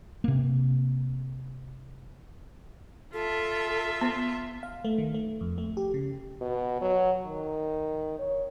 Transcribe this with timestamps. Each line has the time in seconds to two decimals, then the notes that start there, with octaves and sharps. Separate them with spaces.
0.24 C3 A#3
3.13 F4 A4 E5
4.01 B3 C6
4.63 F5
4.85 A3
4.98 D#3
5.14 A3
5.41 F2
5.58 A3
5.77 G4
5.94 C#3
6.41 B2
6.82 F#3
7.25 D#3
8.19 C#5